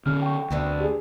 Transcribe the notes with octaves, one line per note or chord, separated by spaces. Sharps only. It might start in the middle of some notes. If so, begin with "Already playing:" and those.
D3 C#4 F6
G5 C#6
D2 D3 B3 C4
G4 G#4